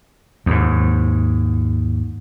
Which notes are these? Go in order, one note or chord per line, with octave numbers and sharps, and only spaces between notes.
D#2 G#2